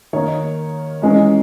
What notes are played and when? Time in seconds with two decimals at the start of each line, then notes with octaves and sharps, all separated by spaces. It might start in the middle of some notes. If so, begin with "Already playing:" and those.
0.13 D#3 A#3 D#4 C#5
1.02 E3 G#3 C#4 D#5